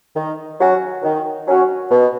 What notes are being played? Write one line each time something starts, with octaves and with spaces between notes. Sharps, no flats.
D#3
F#3 C#4 F#4
D#3
F#3 C#4 F#4
B2